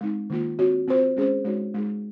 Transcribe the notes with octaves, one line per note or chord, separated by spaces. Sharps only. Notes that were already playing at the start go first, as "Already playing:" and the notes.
G#3 C4 D#4
D#3 A#3 F4
C4 F#4 C#5
C4 F4 C5
G#3 C#4 G#4 C5
G#3 D#4 F#4 C#5
G#3 D#4 G#4